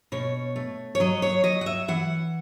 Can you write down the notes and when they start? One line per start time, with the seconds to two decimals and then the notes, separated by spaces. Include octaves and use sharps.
0.12 B2 C#5
0.56 A3
0.95 C#5
1.00 F#3 D#5
1.22 C#5
1.44 F#3 D#5
1.61 F#5
1.66 E5
1.88 E3 F#5